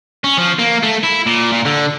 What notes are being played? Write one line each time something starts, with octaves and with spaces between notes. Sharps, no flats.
C#4
F3
A#3
A3
E4
A#2
A#2
D3